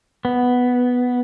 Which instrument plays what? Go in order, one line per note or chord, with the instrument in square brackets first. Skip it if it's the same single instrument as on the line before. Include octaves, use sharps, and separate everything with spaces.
[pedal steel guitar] B3